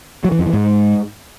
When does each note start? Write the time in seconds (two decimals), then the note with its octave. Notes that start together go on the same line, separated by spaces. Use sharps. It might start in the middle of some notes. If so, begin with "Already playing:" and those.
0.25 F#3
0.32 E3
0.39 F2
0.46 E3
0.53 G#2